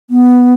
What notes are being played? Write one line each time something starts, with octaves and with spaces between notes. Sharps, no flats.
B3